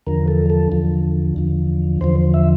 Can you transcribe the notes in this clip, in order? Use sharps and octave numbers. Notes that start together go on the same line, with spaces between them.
E2 D3 F3 A#4
A4
A4
E2 D3 F3
E2 D3 F3
E2 D3 F3 C5
E5